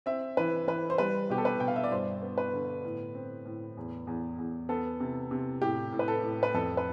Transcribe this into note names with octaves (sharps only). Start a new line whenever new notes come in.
C4 E5
E3 B4
E3 B4
C5
G3 B4
B2 G4
A4
B4
B2 G5
F5
E5
D5
G2 C5
B3
B4
D3
A2
C4
A2
E2
E2
E2
B3 A4
C3
C3
A2 G4
A2
B4
A4
A2
B4
F2 A4
B4